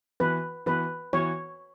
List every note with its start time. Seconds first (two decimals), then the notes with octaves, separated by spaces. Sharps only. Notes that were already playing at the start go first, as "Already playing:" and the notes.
0.20 E3 B3 F#4 B4
0.66 E3 B3 F#4 B4
1.13 E3 B3 F#4 C#5